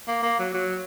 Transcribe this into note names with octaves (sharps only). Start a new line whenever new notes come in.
A#3
A#3
F#3
F#3